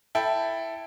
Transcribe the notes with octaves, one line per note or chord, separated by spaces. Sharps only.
E4 A4 G5